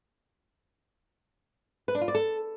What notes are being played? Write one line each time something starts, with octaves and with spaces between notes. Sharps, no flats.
B4
D4
F4
D5
A4